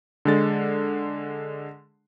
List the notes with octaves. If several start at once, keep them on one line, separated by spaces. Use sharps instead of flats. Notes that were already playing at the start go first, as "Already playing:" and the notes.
D3 G#3 A6